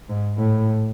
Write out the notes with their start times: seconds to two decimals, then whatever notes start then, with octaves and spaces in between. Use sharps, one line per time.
0.10 G#2
0.37 A2